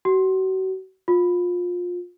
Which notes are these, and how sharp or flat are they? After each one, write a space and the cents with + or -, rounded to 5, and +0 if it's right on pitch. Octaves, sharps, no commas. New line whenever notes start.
F#4 +35
F4 +25